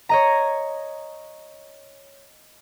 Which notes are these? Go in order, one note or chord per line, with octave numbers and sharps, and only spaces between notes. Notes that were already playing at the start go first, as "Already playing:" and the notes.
C#5 D#5 A#5